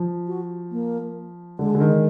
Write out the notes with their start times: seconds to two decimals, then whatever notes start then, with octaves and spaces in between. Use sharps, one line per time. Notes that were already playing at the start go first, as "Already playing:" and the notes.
Already playing: F3
0.27 F#4
0.72 A#3
1.59 D3 G#3
1.75 D3
1.80 D#3